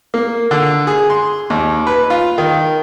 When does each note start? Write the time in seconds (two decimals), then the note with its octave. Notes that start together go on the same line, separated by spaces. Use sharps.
0.14 A#3
0.51 D3
0.87 G#4
1.10 C6
1.50 D#2
1.87 B4
2.10 F4
2.38 D#3